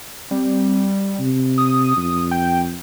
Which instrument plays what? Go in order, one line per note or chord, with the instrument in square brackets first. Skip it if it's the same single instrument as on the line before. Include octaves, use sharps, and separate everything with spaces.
[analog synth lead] G3 [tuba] C4
[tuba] C3
[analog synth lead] D#6
[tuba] F2
[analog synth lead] G5